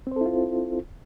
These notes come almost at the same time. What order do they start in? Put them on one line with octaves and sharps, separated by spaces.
C4 C5 A4 E4 F4